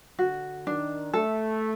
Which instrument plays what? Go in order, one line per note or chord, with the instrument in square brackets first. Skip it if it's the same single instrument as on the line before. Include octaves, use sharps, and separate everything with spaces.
[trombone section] D3 [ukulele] F#4
[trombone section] D#3 [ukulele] D4
[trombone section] A3 [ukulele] A4